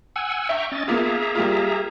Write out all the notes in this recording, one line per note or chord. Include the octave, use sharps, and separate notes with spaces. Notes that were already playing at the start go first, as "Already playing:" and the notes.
F#5 G#5 E6
E5 G5 A#5 C#6
C#4 D#5 A6
A#3 B3 F4 G#4 E5 A#5
G3 A#3 F4